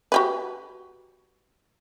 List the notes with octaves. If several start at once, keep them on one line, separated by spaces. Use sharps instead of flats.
F#4 G4 B4